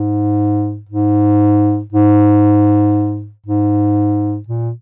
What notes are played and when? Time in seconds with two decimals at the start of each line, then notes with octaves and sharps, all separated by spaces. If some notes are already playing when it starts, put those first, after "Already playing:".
Already playing: G#2
0.89 G#2
1.92 G#2
3.46 G#2
4.48 A#2